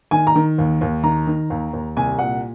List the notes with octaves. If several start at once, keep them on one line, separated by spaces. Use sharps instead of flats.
D#3 G#5
A#5
D#3
D#2
D#2
D#3 A#5
D#3
D#2
D#2
C2 G#5
A#2 F#5